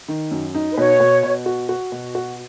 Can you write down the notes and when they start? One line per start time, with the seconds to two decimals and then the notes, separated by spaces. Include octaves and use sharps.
0.08 D#3
0.31 F#2
0.54 D#4
0.71 B4
0.77 B2 C#5
1.00 B2
1.23 B2
1.46 F#4
1.69 F#4
1.92 B2
2.15 F#4